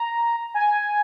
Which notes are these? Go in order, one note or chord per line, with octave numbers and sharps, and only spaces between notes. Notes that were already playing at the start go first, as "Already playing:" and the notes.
Already playing: A#5
G#5